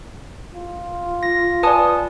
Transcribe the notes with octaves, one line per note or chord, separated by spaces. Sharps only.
F4
A#6
B4 D5 G#5 A5 D#6